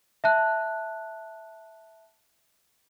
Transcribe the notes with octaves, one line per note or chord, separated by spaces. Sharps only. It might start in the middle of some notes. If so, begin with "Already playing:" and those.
E5 A5 F#6